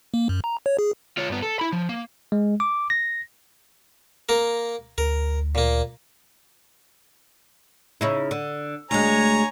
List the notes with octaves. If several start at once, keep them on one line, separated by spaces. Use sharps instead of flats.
A#3
F#2
A#5
C#5
G#4
F4 C#5
G2 B3
A4
E4 B5
F3
A#3
G#3
D6
A#6
A#3 A#4
D2 A#4
A#2 A#3
C#3 D#4 E4
D3
D2 G#3 C#5 G#5 A#5